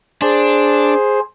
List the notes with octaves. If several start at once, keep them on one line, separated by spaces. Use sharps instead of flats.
D4 G#4 C5